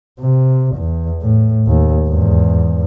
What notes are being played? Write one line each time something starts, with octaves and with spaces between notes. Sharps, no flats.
C3
E2
A2
D#2
E2 G#2